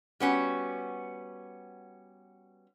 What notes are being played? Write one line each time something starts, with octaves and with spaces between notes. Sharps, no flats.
G3 B3 C#4 F#4